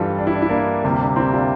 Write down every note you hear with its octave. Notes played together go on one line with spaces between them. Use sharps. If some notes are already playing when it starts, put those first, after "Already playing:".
Already playing: G2 E3 G3 F4 A4
D4
E4
D4
E4
A#3 D4
D2 C3 G3 A#3
A#3 D4
C4 E4
D4 F4